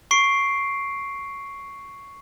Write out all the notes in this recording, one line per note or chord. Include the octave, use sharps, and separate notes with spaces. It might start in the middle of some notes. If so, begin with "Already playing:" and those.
C#6 C7 D7